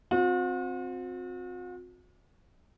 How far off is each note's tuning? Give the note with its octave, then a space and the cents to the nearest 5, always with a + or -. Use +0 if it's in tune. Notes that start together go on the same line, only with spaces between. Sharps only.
C4 +0 F#4 -45